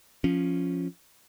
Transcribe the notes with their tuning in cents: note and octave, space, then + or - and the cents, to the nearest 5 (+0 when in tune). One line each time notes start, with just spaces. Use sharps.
F3 +0 C#4 +0